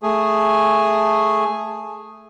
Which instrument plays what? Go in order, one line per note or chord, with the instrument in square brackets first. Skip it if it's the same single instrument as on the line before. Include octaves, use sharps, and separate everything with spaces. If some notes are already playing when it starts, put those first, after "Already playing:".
[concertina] A3 G#4